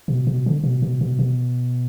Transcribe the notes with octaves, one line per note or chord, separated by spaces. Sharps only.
B2
B2
D3
B2
B2
B2
B2